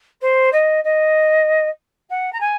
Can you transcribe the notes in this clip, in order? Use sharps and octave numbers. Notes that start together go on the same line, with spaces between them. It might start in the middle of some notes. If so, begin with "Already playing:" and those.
C5
D#5
D#5
F#5
A#5
G#5